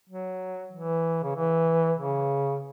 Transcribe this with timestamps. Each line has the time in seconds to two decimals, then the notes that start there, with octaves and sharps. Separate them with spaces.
0.09 F#3
0.73 E3
1.24 C#3
1.36 E3
1.98 C#3